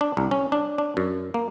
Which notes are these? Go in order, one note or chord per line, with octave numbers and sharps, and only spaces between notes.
D4
C2
C#4
D4
D4
F#2
A#3